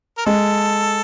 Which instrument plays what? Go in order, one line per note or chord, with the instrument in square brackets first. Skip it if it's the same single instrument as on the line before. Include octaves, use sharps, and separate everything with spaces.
[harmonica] A#4
[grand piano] G#3 [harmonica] A4